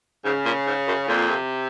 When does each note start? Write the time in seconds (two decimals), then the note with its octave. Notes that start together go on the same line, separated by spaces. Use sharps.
0.24 G#2 C#3
0.45 A#2
0.67 G#2
0.88 F#2
1.08 F2 A#2
1.29 C3